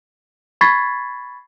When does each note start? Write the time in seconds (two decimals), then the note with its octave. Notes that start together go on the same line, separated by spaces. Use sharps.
0.61 B5 C#6 G#6 A6 B6 C7